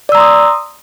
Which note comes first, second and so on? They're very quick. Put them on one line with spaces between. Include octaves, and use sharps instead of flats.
D5 E6 A#5 C6 D#6